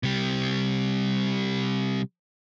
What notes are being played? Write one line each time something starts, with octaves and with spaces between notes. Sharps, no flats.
C3 G3